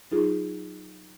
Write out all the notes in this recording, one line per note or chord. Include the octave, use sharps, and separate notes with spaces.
F#3 D#4 F4 G#4